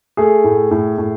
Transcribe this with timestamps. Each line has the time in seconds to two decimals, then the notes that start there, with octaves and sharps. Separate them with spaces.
0.17 A3 G#4
0.44 A2
0.71 A2
0.98 A2